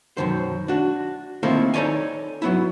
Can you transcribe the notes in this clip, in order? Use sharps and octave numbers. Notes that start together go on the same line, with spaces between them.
F#2 B2 D#3 C5
D4 F#4
D#3 A#3 C4 E4 F4 A4
D#4 A4 C#5 D5 G#5
F#3 B3 E4